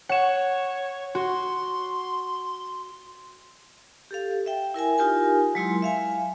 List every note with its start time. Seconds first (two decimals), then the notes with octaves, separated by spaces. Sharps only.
0.09 C#5 F#5 E7
1.15 F#4 C6
4.11 G4 A4 F5
4.46 E5 G5
4.74 E4 A#4 E5 G#5
4.98 D#4 F4 G4 A#4 G#5
5.55 F#3 G#3 E4 C6
5.82 E5 F5 G#5